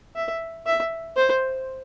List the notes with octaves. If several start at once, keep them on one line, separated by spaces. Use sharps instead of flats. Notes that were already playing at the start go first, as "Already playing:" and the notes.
E5
E5
C5